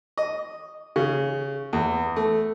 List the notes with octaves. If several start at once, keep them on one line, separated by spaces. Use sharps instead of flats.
D#5
C#3
E2
A3